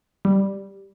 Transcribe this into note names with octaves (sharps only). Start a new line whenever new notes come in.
G3